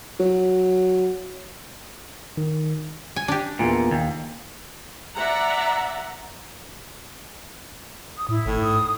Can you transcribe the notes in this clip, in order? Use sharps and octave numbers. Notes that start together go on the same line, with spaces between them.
F#3
D#3
G#5
D4 G4
E2 A#2
D#2
D5 E5 F#5 A#5
D#6
A2 E4
G#1 A2
G#2 D#6